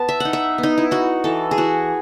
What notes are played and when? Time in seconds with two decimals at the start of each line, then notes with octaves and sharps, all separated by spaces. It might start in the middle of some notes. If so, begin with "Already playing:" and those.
Already playing: B3 A5
0.09 E5
0.20 D#4 F#5
0.33 E5
0.58 B3
0.63 D#4
0.78 E4
0.91 D#4 F#4
1.24 E3 A4
1.51 G#4
1.57 E3 F#4